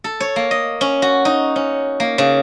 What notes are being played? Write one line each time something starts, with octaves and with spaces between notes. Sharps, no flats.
A4
C#5
A#3
D#5
C#4
F#4
D#4
C#4
A#3
C#3